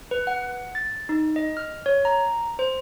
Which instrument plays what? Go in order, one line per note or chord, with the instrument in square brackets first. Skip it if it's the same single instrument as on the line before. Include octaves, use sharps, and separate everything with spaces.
[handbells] B4
F#5
A6
D#4
D#5
F6
C#5
A#5
C5